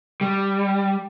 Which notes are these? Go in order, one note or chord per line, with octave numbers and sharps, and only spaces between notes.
G3